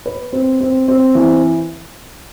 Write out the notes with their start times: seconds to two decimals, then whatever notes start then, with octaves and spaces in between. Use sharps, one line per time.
0.06 B4
0.33 C4
0.61 C4
0.88 C4
1.15 E3